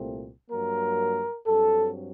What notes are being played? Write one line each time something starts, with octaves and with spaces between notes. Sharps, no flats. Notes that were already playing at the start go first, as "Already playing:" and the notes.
Already playing: C2 A#2 A3 C4
G2 F#3 A#3 A#4
G2 F#3 C4 A4